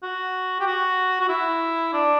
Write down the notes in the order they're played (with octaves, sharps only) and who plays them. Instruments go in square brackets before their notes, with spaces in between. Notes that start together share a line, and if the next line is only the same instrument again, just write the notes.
[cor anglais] F#4
G4
F#4
F#4
E4
D4